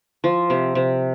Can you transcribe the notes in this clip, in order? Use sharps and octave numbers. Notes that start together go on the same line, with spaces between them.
F3
C3
C3